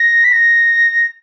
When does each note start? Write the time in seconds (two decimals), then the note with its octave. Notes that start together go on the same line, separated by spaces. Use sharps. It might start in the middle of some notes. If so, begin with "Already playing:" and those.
Already playing: A#6
0.24 B6
0.32 A#6